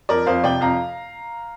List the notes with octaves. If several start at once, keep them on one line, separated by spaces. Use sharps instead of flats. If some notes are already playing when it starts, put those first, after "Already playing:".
F2 A#4 D5
F2 C5 F5
C3 D5 G5
F2 F5 A#5